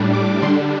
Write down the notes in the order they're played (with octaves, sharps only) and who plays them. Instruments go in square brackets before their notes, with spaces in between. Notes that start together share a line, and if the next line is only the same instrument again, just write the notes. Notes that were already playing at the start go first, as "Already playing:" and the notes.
Already playing: [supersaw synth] A2 G3 D4
D6
D3 G3 D4 C6